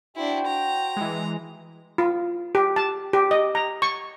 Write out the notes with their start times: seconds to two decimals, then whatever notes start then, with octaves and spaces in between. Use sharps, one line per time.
0.16 D4 E4 F#4 C5 G5
0.47 A#5
0.97 E3 G#3
1.98 F4
2.55 G4
2.76 A5
3.13 G4
3.31 D#5
3.55 A#5
3.82 C#6